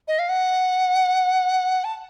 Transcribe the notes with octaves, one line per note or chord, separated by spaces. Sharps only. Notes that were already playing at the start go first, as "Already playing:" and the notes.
D#5
F5
F#5
A5